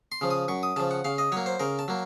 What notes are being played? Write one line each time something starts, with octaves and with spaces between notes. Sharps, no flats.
C6
C#3 F3
D#6
F#2 C#6
D#6
C#3 F3 A5
F#5
C#3 F5
D#5
F#3 A#3 C#5
C5
C#3 A#4
A5
F#3 A#3